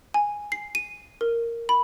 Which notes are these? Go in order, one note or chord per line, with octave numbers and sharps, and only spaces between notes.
G#5
C7
D#7
A#4
B5